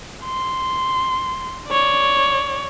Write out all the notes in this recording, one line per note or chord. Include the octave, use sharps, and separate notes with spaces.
C6
C#5 D5